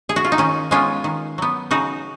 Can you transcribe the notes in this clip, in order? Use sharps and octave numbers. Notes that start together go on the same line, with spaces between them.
G#4
F#4
F4
D#4
D#3 C#4
G#3 B3 C#4 F4
D#3
F#3 B3
C#3 D#4 F#4